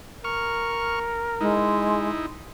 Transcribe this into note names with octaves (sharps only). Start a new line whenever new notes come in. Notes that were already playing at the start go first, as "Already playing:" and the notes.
A#4 C#6 F6
G#3 D#4 E4